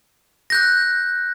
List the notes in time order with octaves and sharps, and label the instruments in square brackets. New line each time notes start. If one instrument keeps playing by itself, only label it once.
[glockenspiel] F#6 G6 A#6